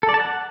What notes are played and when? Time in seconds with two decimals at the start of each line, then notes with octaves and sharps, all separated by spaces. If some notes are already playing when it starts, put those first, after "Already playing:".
0.03 A4
0.09 D5
0.14 A5
0.20 F#5